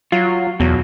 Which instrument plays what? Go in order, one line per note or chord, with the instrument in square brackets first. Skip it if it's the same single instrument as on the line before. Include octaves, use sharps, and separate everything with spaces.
[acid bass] F#3 [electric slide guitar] F4
[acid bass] E2 [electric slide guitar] B2 F#3